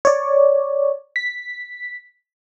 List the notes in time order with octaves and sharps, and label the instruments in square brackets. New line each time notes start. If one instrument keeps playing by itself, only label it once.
[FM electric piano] C#5 D5
B6